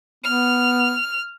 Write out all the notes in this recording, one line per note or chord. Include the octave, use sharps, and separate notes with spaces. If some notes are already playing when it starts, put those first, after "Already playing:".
B3 F6